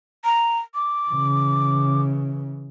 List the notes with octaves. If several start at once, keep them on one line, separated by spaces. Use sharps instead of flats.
A#5
D6
C#3 E3